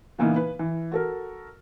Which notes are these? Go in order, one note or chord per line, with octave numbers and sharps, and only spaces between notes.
A#2 C#3 E3 A#3 B3 D#4
B4
E3
F#4 A4 A#4